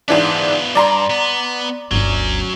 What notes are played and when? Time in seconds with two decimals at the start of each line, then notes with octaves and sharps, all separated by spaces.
0.08 G#2 E3 B3 D4 F4
0.75 G2 D5 A#5 C6
1.10 B3
1.91 G1 D2 F#3 C#4